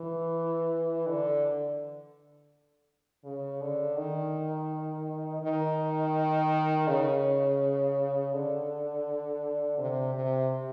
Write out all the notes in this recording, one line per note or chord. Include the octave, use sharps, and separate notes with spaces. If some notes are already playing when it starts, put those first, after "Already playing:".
Already playing: E3
D3
C#3
D3
D#3
D#3
C#3
D3
C3
C3